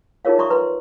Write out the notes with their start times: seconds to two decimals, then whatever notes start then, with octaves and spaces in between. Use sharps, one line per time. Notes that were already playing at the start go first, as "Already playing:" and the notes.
0.25 D#4 F4 G#4 A#4 C#5 F5
0.38 D5 E5 A#5 C6 C#6 D#6
0.50 B4 A#5 C6